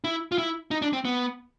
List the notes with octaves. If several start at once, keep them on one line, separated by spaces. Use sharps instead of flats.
E4
F4
E4
D#4
D4
C4
B3